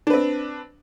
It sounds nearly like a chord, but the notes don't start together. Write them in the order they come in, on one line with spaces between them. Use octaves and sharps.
D4 B4 C4